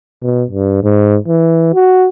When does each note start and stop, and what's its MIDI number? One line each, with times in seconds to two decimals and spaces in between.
0.22 0.44 47
0.51 0.79 43
0.84 1.18 44
1.28 1.74 52
1.74 2.08 66